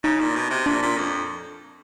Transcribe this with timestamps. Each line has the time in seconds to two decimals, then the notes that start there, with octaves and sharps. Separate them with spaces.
0.04 C#3 D#4
0.20 A#2
0.36 B2
0.51 C3
0.66 A#2 D4
0.83 A#2
0.98 F2